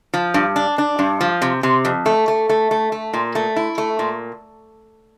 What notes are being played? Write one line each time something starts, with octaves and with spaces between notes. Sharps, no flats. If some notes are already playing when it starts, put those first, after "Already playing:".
F3
G2
D4
D4
G2
F3
C3
C3
F2
A3
A3
A3
A3
A3
A#2
A3
E4
A3
A#2